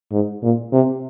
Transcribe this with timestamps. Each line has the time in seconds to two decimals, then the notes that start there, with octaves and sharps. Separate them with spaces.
0.12 G#2
0.42 A#2
0.72 C3